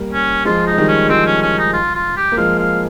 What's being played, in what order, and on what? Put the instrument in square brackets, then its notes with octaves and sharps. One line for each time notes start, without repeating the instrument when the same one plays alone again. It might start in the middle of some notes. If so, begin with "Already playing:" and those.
Already playing: [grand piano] G3 A#3
[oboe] C#4
[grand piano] F3 G#3 [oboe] F4
[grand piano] G#3 [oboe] D#4
[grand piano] D#3 G3
[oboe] C#4
[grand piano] F3 G#3 [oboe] C4
[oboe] C#4
C#4
D#4
F4
F4
G4
[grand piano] A#3
[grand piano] F3 G#3 [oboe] F5
[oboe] F5